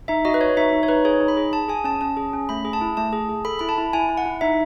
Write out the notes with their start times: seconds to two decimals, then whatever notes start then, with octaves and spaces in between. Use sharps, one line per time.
0.08 D#4 E5
0.25 F#4 D#5
0.34 B4
0.41 F#4 C#5
0.57 D#4 E5
0.72 D#4
0.83 C#5
0.88 D#4 B4
1.05 G#4 C#5
1.20 D#4
1.28 B5
1.37 G#4
1.53 G#4 A5
1.68 G#4 G#5
1.84 C#4 A5
2.01 C#4 A5
2.17 G#4
2.33 C#4
2.49 A3 B5
2.65 G#4
2.73 A5
2.81 E4
2.97 A3 A5
3.13 G#4
3.29 G#4
3.45 A4 B5
3.59 E4 B5
3.69 A5
3.78 E4
3.93 E4 G#5
4.09 E4
4.17 F#5
4.26 E4
4.41 D#4 E5